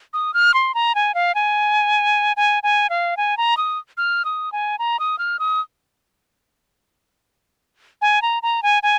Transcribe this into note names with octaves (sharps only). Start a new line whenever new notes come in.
D#6
F6
C6
A#5
G#5
F5
G#5
G#5
G#5
F5
G#5
A#5
D#6
F6
D#6
G#5
A#5
D#6
F6
D#6
G#5
A#5
A#5
G#5
G#5